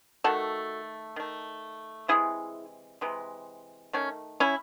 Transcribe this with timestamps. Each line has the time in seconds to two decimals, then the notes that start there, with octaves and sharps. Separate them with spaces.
0.24 D#3 A3 F#4 A4
1.16 D#3 A3
2.08 C3 E3 G#3 E4 G#4
3.01 C3 E3 G#3
3.93 D#3 A3 C#4
4.40 C#4 E4